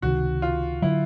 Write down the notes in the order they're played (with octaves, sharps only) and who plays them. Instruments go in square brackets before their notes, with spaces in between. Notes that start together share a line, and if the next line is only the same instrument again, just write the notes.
[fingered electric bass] C#2 C3 D#3 [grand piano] F#4
[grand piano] F4
[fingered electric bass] D3 F#3 [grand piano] E4